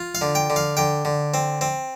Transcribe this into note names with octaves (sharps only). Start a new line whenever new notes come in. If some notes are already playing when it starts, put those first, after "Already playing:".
Already playing: F4
F5
D3
G5
D3
F5
D3 G5
D3
C4
C4